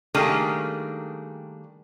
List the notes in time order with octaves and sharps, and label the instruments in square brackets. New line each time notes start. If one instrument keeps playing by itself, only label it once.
[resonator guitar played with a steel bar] D#3 G3 A3 A#3 D4 G#4